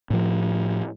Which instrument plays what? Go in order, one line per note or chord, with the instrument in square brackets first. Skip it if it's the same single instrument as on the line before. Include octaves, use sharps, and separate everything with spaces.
[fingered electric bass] A2 F3